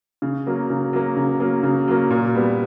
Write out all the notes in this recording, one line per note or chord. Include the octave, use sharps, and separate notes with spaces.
C#3
F#3 A#3
C#3
F#3 A#3
C#3
F#3 A#3
C#3
F#3 A#3
A#2
G3 B3